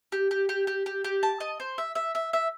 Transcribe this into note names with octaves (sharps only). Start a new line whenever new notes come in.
G4
G4
G4
G4
G4
G4
A5
D#5
C5
E5
E5
E5
E5